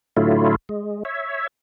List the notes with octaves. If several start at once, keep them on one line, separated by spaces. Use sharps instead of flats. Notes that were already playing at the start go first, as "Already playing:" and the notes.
A2 D3 F#3 A3 E4 F4
G#3
C#5 E5